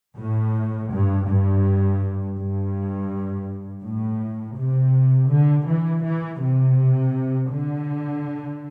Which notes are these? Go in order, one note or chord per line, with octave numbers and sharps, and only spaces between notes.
A2
G2
G2
G2
A2
C3
D3
E3
E3
C3
D3